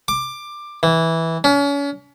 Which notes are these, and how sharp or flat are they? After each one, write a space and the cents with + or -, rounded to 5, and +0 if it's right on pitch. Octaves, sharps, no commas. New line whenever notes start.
D6 +15
E3 -10
C#4 +35